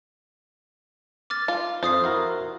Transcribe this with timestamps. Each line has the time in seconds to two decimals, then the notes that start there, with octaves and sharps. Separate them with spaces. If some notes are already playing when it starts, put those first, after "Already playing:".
1.30 D6 F6 A6
1.48 F4
1.83 F2 F4 C5 D#6 C7
2.04 E4 F#4 A#4